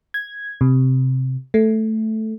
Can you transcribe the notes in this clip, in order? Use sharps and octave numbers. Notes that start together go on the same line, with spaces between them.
G#6
C3
A3